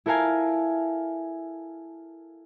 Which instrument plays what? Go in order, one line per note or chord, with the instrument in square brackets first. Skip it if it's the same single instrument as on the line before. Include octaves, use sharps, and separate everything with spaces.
[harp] E4 A4 A#4 F5 G#5